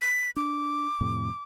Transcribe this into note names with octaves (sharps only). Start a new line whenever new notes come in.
B6
D4 D6
F2 A2 C3